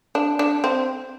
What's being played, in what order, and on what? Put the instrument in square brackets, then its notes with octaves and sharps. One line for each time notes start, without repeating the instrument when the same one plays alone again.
[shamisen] D4
D4
C4